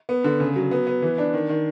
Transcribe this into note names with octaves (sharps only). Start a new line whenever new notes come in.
B3
D3
C#3
F#3
B3
B3
E3
D4
D#3
D#3